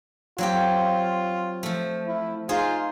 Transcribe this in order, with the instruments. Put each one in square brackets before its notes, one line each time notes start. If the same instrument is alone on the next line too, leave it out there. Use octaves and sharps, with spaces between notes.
[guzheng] F#3 C4 G4 [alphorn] F4
[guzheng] F3 A3
[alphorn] E4
[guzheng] D#4 G#4 C5 [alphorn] F4